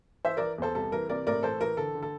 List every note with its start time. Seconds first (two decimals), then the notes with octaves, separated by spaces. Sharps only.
0.25 E3 C5 E5
0.37 E3 A#4 D5
0.58 E2 A4 C5
0.75 C2 A4
0.92 E3 A#4
1.09 C3 A#4 D5
1.27 A2 A#4 D5
1.43 E3 A4 C5
1.61 E3 A#4
1.77 D3 A4
1.95 D3
2.03 A4